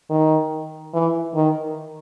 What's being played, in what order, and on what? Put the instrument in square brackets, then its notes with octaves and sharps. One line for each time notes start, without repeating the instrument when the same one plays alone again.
[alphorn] D#3
E3
D#3